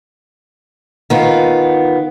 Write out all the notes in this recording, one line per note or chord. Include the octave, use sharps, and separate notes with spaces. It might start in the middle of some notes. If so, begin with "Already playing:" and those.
D#3 B3 F4